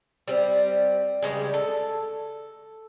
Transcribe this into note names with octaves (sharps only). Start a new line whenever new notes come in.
G3 C4
C#3 E3 G3 G#3
A4